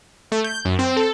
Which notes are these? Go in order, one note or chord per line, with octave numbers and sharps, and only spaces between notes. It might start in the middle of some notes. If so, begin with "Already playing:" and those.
A3
G6
F#2
C4
A4